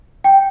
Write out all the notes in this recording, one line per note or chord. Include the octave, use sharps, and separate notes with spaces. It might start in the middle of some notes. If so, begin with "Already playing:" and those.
G5